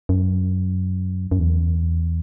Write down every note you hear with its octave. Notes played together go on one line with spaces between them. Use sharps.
F#2
F#2
E2